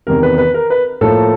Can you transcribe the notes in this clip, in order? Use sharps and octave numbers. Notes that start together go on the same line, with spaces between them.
E2 C3 D#3 A#4
B4
B4
A#4
B4
A2 F3 A#3 A4